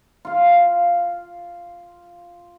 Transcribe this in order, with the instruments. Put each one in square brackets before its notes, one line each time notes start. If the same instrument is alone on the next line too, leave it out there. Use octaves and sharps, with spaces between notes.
[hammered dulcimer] F4 F5